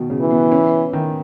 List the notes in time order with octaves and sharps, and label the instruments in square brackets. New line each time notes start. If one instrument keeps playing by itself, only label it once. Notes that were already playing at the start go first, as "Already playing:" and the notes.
Already playing: [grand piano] B2 D#3
C#3
[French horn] E3
[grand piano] B3
C#4
D#3